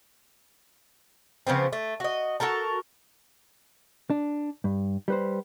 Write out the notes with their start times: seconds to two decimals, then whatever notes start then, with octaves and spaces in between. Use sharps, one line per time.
1.47 C#3 F3 B3 C4
1.73 A3
2.00 F#4 D#5
2.40 F#4 A4 A#4 A5
4.10 D4
4.64 G2
5.08 G3 B4 C5